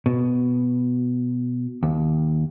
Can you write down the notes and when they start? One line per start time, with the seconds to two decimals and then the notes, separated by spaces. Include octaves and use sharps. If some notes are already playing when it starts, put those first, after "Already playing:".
0.06 B2
1.83 D#2